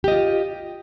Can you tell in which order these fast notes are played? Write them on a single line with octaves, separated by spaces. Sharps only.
G4 D#5 F4